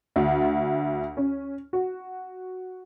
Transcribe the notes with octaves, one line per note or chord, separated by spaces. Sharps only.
D2
C#4
F#4